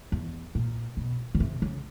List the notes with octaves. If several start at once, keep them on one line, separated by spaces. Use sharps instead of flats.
E2
A#2
B2
C#3
C3
C#3